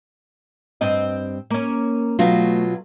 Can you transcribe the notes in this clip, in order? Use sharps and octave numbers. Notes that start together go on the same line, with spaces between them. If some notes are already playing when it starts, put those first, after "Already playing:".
G2 C4 D#5
A#3 C#4
B2 F#3 A3 F4